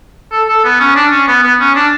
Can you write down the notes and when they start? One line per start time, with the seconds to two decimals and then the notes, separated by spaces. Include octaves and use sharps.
0.32 A4
0.48 A4
0.64 B3
0.80 C#4
0.96 D4
1.12 C#4
1.28 B3
1.43 B3
1.60 C#4
1.76 D4